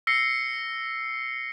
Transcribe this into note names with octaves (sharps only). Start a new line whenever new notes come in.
E6 A#6 C7 C#7